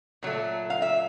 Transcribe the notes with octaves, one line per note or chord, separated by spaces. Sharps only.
A#2 F#3 A3
F5
E5